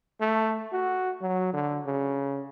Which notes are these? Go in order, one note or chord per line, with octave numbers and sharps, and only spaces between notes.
A3
F#4
F#3
D3
C#3